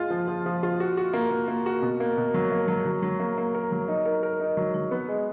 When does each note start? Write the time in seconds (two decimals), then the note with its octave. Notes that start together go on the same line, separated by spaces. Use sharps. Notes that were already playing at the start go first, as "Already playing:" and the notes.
Already playing: G#3 F4
0.10 F3
0.28 F3
0.46 F3
0.63 F4
0.80 F#4
0.97 F#4
1.13 A#3
1.31 A#3
1.48 A#3
1.66 F#4
1.82 B2
2.00 A#3
2.17 B2
2.34 F#3
2.52 A#3
2.68 F#3
2.86 F#3
3.03 F#3
3.20 A#3
3.38 A#3
3.55 A#4
3.72 F#3
3.88 D#4
4.05 A#4
4.23 A#4
4.40 D#4
4.57 F#3
4.75 F#3
4.91 B3
5.09 G#3